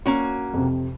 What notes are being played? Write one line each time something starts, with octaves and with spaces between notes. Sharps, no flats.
A#3 C#4 F#4
F2 C3